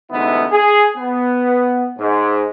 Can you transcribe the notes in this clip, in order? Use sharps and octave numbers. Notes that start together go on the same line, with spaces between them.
A1 D2 G#2 B3 D#4 E4
G#4
B3
G#2